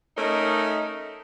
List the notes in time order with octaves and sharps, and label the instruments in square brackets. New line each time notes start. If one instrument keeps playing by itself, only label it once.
[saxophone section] A3 C#4 D#4 A#4 D#5